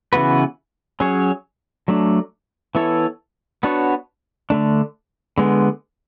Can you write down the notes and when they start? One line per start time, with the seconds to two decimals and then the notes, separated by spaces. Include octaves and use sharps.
0.13 C#3 E3 B3 F#4 B4
1.00 F#3 C#4 G#4 C#5
1.88 F#3 A3 D4
2.75 E3 B3 E4 A4 C#5
3.63 B3 D4 F#4 C#5
4.50 D3 A3 D4
5.38 D3 G#3 B3